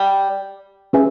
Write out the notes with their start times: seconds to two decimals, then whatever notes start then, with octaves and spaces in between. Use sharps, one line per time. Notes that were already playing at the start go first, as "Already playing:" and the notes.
Already playing: G3
0.93 C#4 G#4 B4 E5 G#5